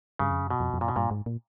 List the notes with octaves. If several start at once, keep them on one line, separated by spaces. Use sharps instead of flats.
G2 C#3
F2
F#2
B2
F2
F2
F#2 A#2
B2
G2 A#2
G#2
A#2